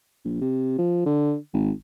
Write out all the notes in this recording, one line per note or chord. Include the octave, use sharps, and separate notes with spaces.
A#1
C3
F3
D3
G#1